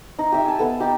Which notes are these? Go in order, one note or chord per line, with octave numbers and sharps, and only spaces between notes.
D#4
G4 E5
G#5 A5
B3 A4
D#4 G4